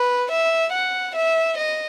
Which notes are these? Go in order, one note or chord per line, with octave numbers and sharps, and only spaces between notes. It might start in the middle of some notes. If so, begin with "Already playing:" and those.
Already playing: B4
E5
F#5
E5
D#5